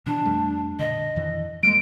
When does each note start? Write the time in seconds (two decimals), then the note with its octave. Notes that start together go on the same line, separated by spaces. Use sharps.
0.06 B2 E3 D4
0.25 F2 G3 A3
0.79 A#2 D3 D#5
1.16 F2 D#3 E3
1.63 G3 G#3 A#3 D7